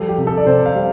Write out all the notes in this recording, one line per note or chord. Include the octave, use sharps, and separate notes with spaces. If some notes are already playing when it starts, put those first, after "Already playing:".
Already playing: F3 G3 A4
G4
C3
A4
D5
C3 C5
F5
G3